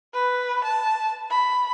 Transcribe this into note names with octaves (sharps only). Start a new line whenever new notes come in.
B4
A5
B5